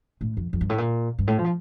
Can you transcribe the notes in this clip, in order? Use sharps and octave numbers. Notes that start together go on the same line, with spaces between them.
A2
F2
F2
G2
A2
A#2
G2
A2
F3